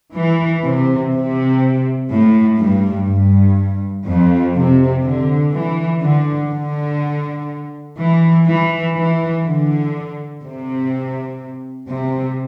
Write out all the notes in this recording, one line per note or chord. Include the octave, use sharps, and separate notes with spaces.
E3
C3
C3
A2
G2
G2
F2
C3
D3
E3
D3
D3
E3
E3
E3
D3
C3
C3